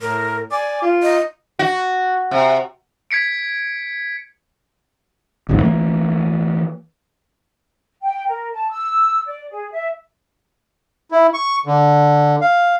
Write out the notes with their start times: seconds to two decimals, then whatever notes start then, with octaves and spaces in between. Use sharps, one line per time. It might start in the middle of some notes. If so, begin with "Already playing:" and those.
0.01 A2 A#4
0.52 D5 G#5
0.82 F4
1.02 D#5
1.59 F#4
2.31 C3
3.11 G#6 B6 C#7 D7
5.49 D1 A1 E2 G#2
5.62 E3 A3 A#3
8.03 G5
8.27 A#4
8.53 A5
8.71 E6
9.26 D5
9.51 G#4
9.72 E5
11.12 E4
11.34 C#6
11.66 D3
12.41 F5